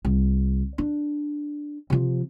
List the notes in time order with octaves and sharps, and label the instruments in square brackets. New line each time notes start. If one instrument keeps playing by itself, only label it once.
[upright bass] C2
D4
C3 F3